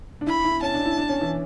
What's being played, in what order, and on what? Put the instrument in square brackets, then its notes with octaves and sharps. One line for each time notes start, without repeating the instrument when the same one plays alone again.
[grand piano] D4
[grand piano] E4 [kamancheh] B5
[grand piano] E4
[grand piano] C#4 [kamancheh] A5
[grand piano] D4
E4
D4
C#4
E3